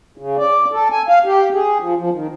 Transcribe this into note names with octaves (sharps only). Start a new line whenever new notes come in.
C#3
D5
A4
G#5
F5
G4
G#4
F3
F3
D#3